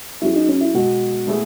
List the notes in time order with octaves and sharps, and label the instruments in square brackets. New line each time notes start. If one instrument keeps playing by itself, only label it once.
[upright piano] F#3 C#4 G#4 B4 [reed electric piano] E4
[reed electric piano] D#4
C#4
E4
[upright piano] B2 G#3 B3 [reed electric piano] F#4
[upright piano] B2 A3 E4 G#4 B4